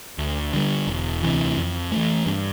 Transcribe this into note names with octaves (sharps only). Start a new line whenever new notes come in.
D2
D3 G3
E1
D2 C3 E3
F2
E3 A3
G2